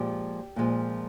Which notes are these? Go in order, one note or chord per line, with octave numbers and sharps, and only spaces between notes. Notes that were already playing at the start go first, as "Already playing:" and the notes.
Already playing: A#2 F3 G#3 G4
A#2 F3 G#3